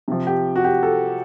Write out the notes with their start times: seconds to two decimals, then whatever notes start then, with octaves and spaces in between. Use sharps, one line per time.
0.08 C3 F3
0.27 G4
0.56 F#4
0.64 G4
0.83 A4